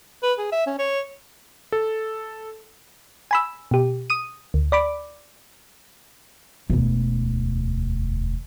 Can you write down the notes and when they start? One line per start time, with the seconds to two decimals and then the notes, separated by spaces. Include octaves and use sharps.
0.23 B4
0.39 G#4
0.52 E5
0.67 C#4
0.79 C#5
1.72 A4
3.31 G#5 B5 E6
3.71 B2 G4
4.10 D#6 D#7
4.54 D2
4.72 D5 B5 D6
6.70 E1 D2